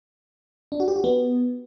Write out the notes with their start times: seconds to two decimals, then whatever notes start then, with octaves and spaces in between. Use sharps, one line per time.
0.72 D4
0.80 F#4
0.88 G4
0.96 F#4
1.04 B3